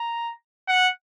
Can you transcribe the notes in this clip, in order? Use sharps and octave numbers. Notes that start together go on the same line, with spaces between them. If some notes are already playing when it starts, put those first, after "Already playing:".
Already playing: A#5
F#5